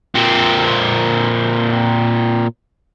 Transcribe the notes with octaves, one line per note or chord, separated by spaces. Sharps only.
A#2 C4